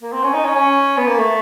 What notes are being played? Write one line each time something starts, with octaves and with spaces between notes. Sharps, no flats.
A#3
C4
C#4
D#4
C#4
C#4
B3
A#3
A3